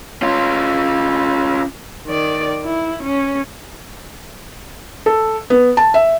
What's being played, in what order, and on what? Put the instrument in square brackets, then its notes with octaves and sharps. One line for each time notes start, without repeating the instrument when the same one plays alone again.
[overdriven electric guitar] C#4 F4
[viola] D#3 D5
E4
C#4
[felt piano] A4
B3
A5
E5